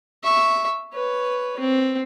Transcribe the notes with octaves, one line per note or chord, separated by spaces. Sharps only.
E5 C#6
B4 C#5
C4